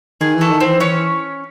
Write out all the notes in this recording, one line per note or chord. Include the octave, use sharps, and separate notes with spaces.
D#3 G#4
E3
A3 A4
D#3
E3 C4 C5
E3 C#4 C#5